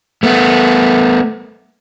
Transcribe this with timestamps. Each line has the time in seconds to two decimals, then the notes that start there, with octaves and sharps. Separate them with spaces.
0.23 A3 B3